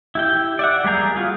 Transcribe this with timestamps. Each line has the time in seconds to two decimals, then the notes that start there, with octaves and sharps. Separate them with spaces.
0.15 E4 G4 G5
0.59 D5 E5 F#5
0.84 G3 A#3 G#4 A#5 G6
1.16 B3 F4 F#4 G#4